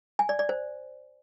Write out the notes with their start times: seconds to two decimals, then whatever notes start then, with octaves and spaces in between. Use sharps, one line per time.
0.19 G#5
0.29 D5
0.39 D5
0.49 C5